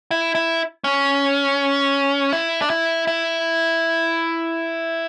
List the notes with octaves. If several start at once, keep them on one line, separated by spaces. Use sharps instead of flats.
E4
E4
C#4
E4
D4
E4
E4